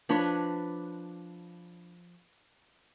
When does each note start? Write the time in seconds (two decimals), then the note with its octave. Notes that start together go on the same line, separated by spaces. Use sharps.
0.09 F3 D4 B4 C#5